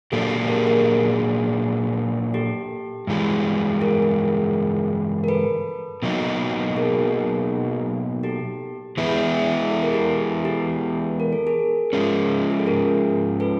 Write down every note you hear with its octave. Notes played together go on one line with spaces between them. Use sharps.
A#2 F#3 A#3 D4 G4 A4
G4 A4
G#4 A#4
G#4 A#4
G#4
G4 A4
G2 E3 G#3
G#4 A#4
A#4
A4 B4
B2 F#3 A#3 D#4
G#4 A#4
G4 A4
E3 G#3 B3 E4 G#4
A4
A#4
G4 A4
G4 A4
A#4
A4
G#4 A#4
F3 G#3 C#4
G#4
A4
G#4 A#4
A4 B4